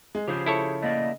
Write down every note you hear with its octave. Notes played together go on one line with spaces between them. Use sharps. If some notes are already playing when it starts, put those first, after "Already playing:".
G#3
C#3 F3 G4 G#4 C5
E4 A4 C#5
A3 A#3 D5 D#5